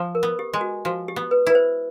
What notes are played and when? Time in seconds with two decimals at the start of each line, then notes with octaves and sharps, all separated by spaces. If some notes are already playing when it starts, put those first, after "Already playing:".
Already playing: F3
0.15 A#4
0.23 B3
0.39 G4
0.53 G#3
0.61 F#4
0.85 F3 F#4
1.08 G4
1.16 B3
1.31 B4
1.47 E4 B4
1.55 C5